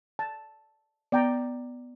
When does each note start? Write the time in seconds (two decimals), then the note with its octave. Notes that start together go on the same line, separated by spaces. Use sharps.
0.19 A5
1.12 B3 D5 G5 A#5